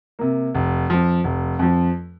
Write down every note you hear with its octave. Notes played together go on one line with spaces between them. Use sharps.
C3 A#3
F1
F2 F3
F1
F2 F3